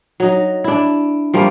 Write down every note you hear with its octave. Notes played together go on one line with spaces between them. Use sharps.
F#3 D#4
D4 E4
F3 G3 A3 A#3